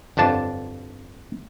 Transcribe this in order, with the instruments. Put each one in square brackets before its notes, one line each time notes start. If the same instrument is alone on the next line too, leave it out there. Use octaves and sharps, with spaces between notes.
[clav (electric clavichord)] G1 F2 D4 A5